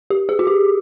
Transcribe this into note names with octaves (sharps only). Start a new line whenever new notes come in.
G4
G#4
F#4
G4